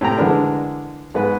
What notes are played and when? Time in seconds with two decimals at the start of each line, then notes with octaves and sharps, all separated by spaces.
0.01 A2 C3 G5 A#5
0.17 D3 E3 G#3 D4 A#4
1.14 G#2 G#3 B3 B4